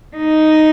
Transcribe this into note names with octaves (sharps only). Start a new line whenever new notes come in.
D#4